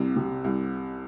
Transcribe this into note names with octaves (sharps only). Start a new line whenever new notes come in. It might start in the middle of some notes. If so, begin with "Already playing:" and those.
Already playing: C2 C3
C3
C2